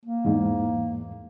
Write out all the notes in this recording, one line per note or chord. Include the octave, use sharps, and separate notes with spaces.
A#3
E2 G#2